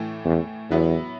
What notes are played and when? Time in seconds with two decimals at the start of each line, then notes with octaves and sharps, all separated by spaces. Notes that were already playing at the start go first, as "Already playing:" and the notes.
Already playing: A2 E3 A3
0.25 E2
0.70 E2 F#3 B3 E4